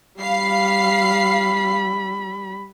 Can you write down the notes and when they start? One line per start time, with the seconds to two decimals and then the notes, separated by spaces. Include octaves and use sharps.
0.20 G3 F5 B5 C7